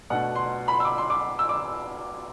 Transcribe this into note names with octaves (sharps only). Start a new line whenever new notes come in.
B2 A3 D4 F#5
C6
B5
C6
E6
D6
C6
D6
E6
D6